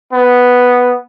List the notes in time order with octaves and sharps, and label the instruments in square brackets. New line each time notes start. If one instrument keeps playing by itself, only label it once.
[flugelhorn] B3